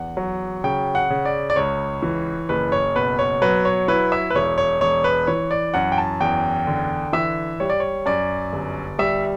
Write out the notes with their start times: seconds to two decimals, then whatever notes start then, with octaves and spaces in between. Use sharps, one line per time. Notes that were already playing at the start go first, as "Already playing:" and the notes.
Already playing: E2 F#5
0.17 F#3
0.64 C#3 G5
0.95 F#5
1.10 C#3
1.25 D5
1.50 D5
1.56 C#2 C#5
2.02 E3
2.49 F#1 B4
2.72 C#5
2.95 B2 B4
3.19 C#5
3.42 F#3 B4
3.65 C#5
3.88 E4 B4
4.12 E5
4.30 B4
4.35 E1 C#5
4.58 C#5
4.81 E1 C#5
5.04 B4
5.27 E3 C#5
5.51 D5
5.74 F#2 F#5
5.92 G5
5.98 A5
6.20 E2 G5
6.67 D3
7.13 E3 E5
7.60 G3 C#5
7.70 D5
7.80 C#5
8.06 F#2 D5
8.53 G1
8.99 G3 E5